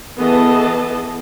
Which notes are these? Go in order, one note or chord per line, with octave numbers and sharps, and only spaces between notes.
E3 B3 G#4 A4 D#5 A5